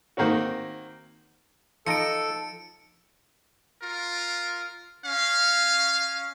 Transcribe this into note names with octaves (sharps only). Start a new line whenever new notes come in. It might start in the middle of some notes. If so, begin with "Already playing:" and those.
D#3 A#3 C4 F#4
F3 D#4 A4 C#7 D7
F4 A#4
C#4 F5